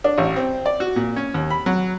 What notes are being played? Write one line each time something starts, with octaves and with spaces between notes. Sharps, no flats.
D4
A1
C4
D5
F#4
A#2
C#4
D#2
B5
F#3